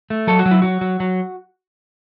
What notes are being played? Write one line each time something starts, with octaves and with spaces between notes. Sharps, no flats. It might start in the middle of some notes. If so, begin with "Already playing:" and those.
A3
F#3 A4
F#4
F#3
E4
F#3 F#4
F#3
F#3